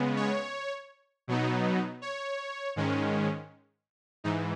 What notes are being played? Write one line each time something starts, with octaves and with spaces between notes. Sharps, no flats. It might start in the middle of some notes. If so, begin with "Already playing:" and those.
Already playing: C#3 G#3 B3
C#5
B2 F#3 B3 D#4
C#5
G#2 D#3 G#3 C#4
G#2 E3 D#4